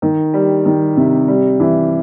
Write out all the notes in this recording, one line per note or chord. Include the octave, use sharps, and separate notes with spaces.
D#3
G3
D#3
C3
G3
E3